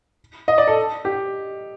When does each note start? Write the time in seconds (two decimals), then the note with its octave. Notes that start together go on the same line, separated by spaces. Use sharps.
0.48 D#5
0.58 D5
0.67 A4
1.05 G4